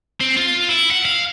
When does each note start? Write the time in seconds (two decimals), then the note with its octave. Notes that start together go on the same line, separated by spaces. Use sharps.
0.20 C4
0.37 F4
0.69 E4
0.91 F#5
1.05 F5